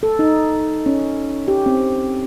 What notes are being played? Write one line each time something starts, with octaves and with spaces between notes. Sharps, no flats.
A4
D#4
C#4
G4
C4